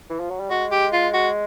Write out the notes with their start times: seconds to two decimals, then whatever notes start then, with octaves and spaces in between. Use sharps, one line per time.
0.10 E3
0.19 F3
0.30 F#3
0.39 G3
0.50 G#3 F#4
0.72 G4
0.93 F4
1.14 F#4